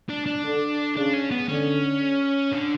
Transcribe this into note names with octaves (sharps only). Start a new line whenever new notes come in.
D4
D4
D3
C#3 D4
C#4
B3
D3 C#4
D3